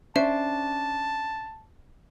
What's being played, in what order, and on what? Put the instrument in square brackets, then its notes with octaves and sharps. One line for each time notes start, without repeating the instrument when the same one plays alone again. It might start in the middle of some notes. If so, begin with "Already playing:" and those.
[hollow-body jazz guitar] C#4 D4 C5 [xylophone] E5 [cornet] A5